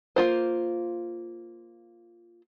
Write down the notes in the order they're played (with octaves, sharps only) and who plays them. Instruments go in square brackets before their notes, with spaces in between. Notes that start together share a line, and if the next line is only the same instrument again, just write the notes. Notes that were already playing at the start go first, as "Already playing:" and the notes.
[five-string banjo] A#3 F4 C5